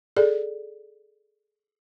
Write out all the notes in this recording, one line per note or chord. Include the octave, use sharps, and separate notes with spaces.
G#4 A4 D5